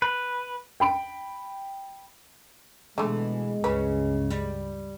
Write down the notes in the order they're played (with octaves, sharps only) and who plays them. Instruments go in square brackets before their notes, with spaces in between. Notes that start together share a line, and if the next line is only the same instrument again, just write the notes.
[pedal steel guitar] B4
[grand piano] G5 B5 D7
[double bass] B2 B3 [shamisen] D3 A3 [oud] E3 [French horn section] G#3
[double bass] C#2 G2 [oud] C#3 C#4 [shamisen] B4
[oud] G3